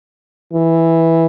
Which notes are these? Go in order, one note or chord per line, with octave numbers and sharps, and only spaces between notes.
E3